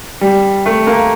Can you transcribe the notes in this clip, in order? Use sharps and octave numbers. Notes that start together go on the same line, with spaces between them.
G3
A3
A#3